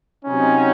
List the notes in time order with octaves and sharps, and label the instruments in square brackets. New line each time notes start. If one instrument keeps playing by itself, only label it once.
[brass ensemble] C3 F#3 C4 D#4 [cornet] C#4